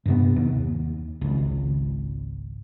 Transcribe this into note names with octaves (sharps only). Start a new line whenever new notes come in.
G2 C3 B3
D#2
G#1 C#2